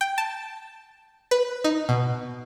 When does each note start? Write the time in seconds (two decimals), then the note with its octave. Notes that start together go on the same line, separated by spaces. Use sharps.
0.01 G5
0.18 A5
1.31 B4
1.64 D#4
1.89 B2